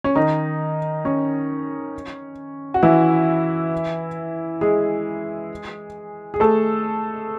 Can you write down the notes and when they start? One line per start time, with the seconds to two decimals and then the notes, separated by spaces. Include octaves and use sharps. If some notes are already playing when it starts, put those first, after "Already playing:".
0.04 C#4
0.15 D#3 D#4
1.05 C#4
2.74 F#4
2.83 E3 E4
4.61 G#3 G#4
6.34 G#4
6.40 A3 A4